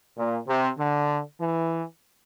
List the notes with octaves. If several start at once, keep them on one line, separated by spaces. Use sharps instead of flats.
A#2
C3
D3
E3